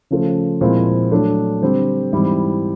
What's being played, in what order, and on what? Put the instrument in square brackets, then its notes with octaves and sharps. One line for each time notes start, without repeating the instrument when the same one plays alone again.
[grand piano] C#3 F3 A3
A#2 F3 G#3 C4 E4
F#3 A3 D4
D3 G3 C4
G#2 E3 G3 C4 E4